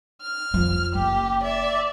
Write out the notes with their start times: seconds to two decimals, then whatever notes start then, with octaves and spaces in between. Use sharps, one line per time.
0.21 F6
0.54 F2 F3
0.95 F#1 G4
1.43 D5 E5